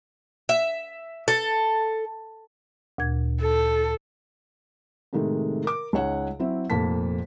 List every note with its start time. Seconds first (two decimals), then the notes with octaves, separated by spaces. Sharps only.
0.49 E5
1.28 A4
2.98 D2 A#2 G#6
3.41 A4
5.13 A2 C3 D#3 G#3 A3
5.64 A#4 D6
5.93 C#2 D#4 C#5 F#5
6.39 F#3 C4 E4
6.70 F1 F2 A#2 A5 B6